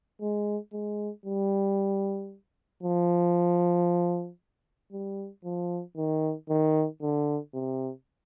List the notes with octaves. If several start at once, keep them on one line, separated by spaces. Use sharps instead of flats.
G#3
G#3
G3
F3
G3
F3
D#3
D#3
D3
C3